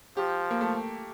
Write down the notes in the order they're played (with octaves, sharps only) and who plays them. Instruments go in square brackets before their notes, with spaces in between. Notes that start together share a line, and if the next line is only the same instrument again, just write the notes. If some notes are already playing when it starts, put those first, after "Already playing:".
[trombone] F3 [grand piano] G4
[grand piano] A#3
A3